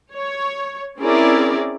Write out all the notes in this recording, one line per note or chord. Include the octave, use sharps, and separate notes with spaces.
C#5
C4 C#4 E4 G#4 A#4 D5